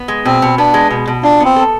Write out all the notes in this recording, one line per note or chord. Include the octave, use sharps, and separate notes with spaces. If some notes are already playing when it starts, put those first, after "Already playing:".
Already playing: B3
G#3
B2 C4
B2
B3 D4
G#3
B2
B2
D4 F4
B3 C4
A4